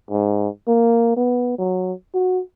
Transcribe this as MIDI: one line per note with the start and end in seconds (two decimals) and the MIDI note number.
0.11 0.48 44
0.68 1.16 58
1.17 1.58 59
1.59 1.93 54
2.14 2.41 66